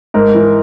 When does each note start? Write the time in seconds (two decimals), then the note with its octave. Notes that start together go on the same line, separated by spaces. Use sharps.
0.14 G#2 A#4
0.34 E3